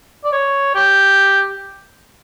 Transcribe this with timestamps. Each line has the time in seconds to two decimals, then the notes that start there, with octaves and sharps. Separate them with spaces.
0.24 D5
0.32 C#5
0.75 G4